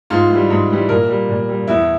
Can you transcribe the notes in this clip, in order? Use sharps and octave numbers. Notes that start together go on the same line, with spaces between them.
G#2 F4
E3 G3
G#2
E3 G3
A#2 A#4
G3
A#2
G3
E2 E4